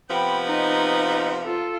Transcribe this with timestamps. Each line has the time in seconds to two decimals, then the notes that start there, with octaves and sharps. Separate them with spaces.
0.10 C3 F3 B3 G5 B5
0.46 D#4 D#5
1.43 F4 A4